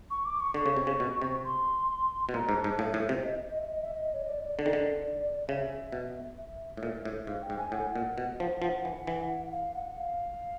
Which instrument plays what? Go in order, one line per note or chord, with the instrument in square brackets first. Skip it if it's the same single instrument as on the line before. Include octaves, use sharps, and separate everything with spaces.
[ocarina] C#6
D6
C#6
[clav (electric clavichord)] D3 [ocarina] C#6
[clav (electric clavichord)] C#3
C3
C#3
B2
C3
[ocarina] C6
[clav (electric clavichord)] B2
[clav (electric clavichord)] A#2 [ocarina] A#5
[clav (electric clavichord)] G#2
[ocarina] A5
[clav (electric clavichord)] G#2
[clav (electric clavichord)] A2 [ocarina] F5
[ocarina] E5
[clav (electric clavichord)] A2
C3
[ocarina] D#5
E5
D#5
E5
D#5
E5
D#5
C#5
D#5
D5
D5
[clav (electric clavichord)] D3 [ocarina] D5
[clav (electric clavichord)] D#3
D3
[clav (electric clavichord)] C#3 [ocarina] E5
[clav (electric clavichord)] B2
[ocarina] E5
[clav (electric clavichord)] A2
A#2
A2
[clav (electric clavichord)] G#2 [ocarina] F5
[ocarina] G5
[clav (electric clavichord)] G#2
[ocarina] G#5
[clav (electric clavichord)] A2 [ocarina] F#5
[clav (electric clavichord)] A#2
B2
F3
[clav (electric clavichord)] F3 [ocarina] F#5
[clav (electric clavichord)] E3
E3
[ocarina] F5
F#5
F5